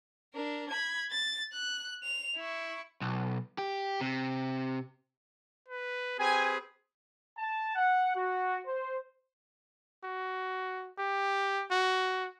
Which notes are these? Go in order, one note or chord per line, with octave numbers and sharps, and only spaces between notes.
D4 A#4
B5 G#6
A6
F#6
F7
E4 C#6
B1
G4
C3
B4
C4 G4 G#4 B4 G#5
A5
F#5
F#4
C5
F#4
G4
F#4